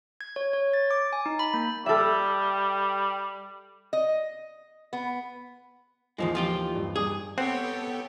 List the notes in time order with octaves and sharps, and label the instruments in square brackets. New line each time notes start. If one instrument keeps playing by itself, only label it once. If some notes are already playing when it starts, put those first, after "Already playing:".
[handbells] G#6
C#5
C#5
A6
D6
G#5
D#4
B5
A#3
[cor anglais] G3 [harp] A4 E5
[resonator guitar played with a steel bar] D#5
B3
[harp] D#2 E3 [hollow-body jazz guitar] G#2 F3 G#3
[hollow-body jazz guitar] F3 F4 G4
[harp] G2
[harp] G2 D6 D#6 [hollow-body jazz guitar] G#4
[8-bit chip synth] B3 A4 G5 [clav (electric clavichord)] C4 [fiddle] G4 C#5 [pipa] F#5